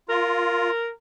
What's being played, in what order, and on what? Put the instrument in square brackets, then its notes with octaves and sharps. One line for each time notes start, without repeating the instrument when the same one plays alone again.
[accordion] F4 [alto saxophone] A#4